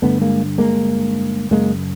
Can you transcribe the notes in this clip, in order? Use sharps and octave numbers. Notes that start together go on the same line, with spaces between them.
G2 D3 A3 B3
G#3 A#3
G#3 A#3
F#2 C#3 G#3 A#3